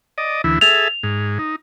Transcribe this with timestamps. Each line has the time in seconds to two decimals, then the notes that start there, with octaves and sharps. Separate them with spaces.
0.18 D5 D#5
0.44 D2 E3 E4
0.61 G#4 A4 E5 F7
1.03 G#2
1.39 D#4